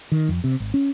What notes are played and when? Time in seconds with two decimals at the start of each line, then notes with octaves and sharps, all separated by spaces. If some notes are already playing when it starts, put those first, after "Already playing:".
0.12 D#3
0.29 F2
0.44 C3
0.60 G#1
0.74 C#4